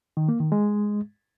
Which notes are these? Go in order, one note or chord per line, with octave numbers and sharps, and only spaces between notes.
D#3
A#3
D#3
G#3